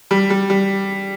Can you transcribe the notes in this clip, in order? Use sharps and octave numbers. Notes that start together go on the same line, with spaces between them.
G3
G3
G3